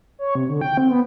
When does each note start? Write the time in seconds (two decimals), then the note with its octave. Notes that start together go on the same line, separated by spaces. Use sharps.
0.19 C#5
0.35 C3
0.49 D3
0.61 G5
0.78 C4
0.90 B3